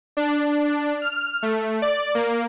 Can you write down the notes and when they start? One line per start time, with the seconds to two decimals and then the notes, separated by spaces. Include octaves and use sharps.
0.17 D4
1.02 F6
1.42 A3
1.82 D5
2.15 A#3